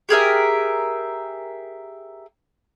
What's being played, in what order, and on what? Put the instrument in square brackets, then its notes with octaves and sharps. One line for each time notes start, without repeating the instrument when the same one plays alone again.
[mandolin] G4 G#4 A#4 E5